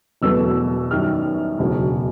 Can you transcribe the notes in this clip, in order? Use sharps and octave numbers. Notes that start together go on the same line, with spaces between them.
E1 E2 B2 F#3 A3 E6
F#2 D#3 G3 F6
E1 D2 C#3 F#3